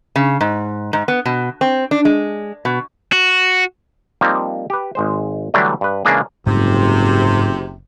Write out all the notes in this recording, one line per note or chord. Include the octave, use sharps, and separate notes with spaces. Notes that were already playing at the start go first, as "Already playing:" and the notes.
C#3
G#2
G#2
B3
B2
C4
D4
G#3
B2
F#4
F3 G3 A#3 C4 D#4
G4 B4
G#1 G#3 C5
D3 E3 F#3 G3 A3 D4
G2 B4
C#3 E3 G#3 A#3 D4 G#4
F#1 G#2 C3 G3